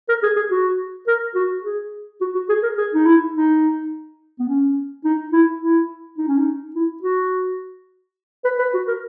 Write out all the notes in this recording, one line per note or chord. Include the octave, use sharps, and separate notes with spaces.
A#4
G#4
G#4
F#4
A#4
F#4
G#4
F#4
F#4
G#4
A#4
G#4
D#4
E4
D#4
B3
C#4
D#4
E4
E4
D#4
C#4
D#4
E4
F#4
B4
B4
F#4
A#4